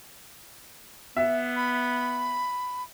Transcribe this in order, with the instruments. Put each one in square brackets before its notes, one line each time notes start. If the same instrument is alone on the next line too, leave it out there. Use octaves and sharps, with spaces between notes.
[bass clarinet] B3 [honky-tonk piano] E5
[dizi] B5